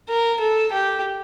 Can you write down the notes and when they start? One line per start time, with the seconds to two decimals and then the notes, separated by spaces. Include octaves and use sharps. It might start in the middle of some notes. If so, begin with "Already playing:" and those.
0.10 A#4
0.40 A4
0.73 G4